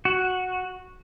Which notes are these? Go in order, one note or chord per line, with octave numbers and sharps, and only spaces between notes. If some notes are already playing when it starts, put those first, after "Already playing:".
F#4